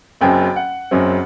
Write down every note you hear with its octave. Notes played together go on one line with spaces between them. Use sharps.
F#1 F#2 F#3 C4 G5
F#5
F#1 F#2 F#3 C4